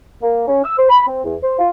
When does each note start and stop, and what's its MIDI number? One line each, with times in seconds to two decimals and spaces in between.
0.22 0.44 58
0.47 0.61 61
0.64 0.76 88
0.78 0.85 72
0.89 1.03 83
1.06 1.22 60
1.24 1.35 40
1.42 1.56 72
1.58 1.69 65